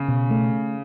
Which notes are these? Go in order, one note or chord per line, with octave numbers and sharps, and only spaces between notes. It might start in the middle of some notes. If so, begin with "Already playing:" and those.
Already playing: C#3
B2
A3